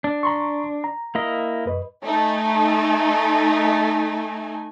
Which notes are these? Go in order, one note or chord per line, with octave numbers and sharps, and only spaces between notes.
D4
A#5 C6 C#6
A#5
A#3 E4 D#5
F#2 B4 D#5
A3 D#4 G#5